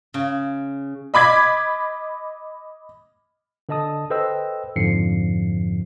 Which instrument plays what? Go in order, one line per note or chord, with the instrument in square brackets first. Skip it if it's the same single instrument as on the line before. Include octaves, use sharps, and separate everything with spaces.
[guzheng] C#3
[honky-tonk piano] D#5 B5 D6 G#6 B6
[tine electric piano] D3 A4 D#5 A5 D#6
A4 B4 C5 D#5 G5 E6
F2 G#2 D3 F3 C7 C#7